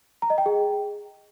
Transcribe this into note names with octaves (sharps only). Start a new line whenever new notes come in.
A#5
D#5
G5
G#4